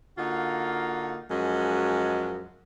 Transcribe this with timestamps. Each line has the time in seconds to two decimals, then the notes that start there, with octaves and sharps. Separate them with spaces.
0.18 D3 A#3 D#4 F4 F#4
1.31 F#2 F3 F#3 G#3